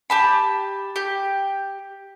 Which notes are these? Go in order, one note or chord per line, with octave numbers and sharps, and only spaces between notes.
G4 A5 B5
G4